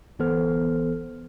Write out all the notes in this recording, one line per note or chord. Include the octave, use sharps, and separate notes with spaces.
G1 E3 B3 A4 C5 F6